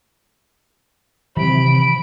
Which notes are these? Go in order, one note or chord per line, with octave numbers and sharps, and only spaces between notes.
C3 D#3 E3 F#3 B5 D7